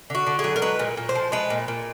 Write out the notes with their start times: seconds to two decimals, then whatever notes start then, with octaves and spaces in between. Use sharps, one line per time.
0.10 D3 F#4
0.27 D3
0.39 G#4
0.44 F#3
0.56 A#4
0.62 G#3 B4
0.79 A#2
0.97 A#2
1.09 C5
1.15 F3
1.32 G#3 B4
1.50 A#2
1.68 A#2